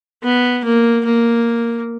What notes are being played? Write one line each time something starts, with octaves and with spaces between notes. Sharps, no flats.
B3
A#3
A#3